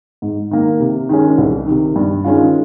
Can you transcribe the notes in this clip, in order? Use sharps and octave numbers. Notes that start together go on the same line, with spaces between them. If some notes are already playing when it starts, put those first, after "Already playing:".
G#2
D#3 A#3
C3
D#3 G#3 C#4
C2
C3 D#3
G2
D#3 G#3 C#4 F4